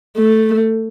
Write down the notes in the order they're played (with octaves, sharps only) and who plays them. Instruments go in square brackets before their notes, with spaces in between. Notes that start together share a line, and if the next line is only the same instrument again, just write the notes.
[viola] A3